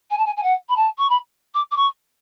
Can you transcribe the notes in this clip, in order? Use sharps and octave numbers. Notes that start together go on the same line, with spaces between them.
G#5
A5
G#5
G#5
F#5
B5
A5
C#6
B5
D6
D6
C#6